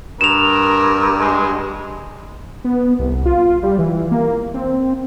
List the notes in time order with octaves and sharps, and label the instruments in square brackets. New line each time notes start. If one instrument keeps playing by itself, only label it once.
[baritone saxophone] G2 [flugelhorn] A#4 [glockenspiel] E7 F7
[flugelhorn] G#3
[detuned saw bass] B3
C2
F4
G3
E3
A#3
C4